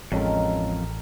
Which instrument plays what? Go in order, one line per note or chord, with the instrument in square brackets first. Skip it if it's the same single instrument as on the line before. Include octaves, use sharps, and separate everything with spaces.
[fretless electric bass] A1 [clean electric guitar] F2 [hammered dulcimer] D#3 A4 A#4 [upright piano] G#3 C#4